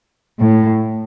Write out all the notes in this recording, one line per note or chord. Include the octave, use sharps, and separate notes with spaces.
A2